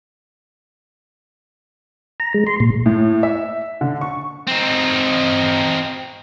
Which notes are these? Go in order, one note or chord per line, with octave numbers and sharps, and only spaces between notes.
A#5
G#3
C6
A#2
A2
E5
D3
C#6
C4 D#4